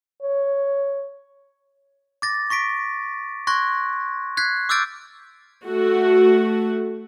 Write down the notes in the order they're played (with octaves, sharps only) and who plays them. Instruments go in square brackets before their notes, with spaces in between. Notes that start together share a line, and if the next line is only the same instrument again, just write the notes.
[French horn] C#5
[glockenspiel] D6 A6 A#6
C#6 A#6 B6 D7
C6 C#6 F#6 G#6 A#6
F#6 G#6 B6 C7
D6 E6 F6 G6 A6 D7
[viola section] A3 F#4